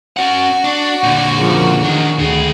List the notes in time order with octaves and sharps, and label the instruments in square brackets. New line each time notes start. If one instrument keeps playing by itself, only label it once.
[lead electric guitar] C#4 F#5 [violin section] F#4
[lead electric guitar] D4
A#2 D3
[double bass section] C#3 F3 A#3
[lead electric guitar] E2 D4 [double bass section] D#3
[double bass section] D2 [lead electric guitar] D#3 G#4